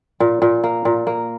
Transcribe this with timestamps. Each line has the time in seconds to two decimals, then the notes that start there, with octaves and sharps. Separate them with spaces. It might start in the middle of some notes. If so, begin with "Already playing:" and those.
0.20 A#2
0.42 A#2
0.64 A#3
0.85 A#2
1.07 A#3